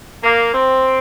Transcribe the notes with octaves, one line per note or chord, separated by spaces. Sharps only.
A#3
C4